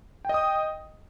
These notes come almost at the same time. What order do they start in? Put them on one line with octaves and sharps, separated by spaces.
G5 D#5 D#6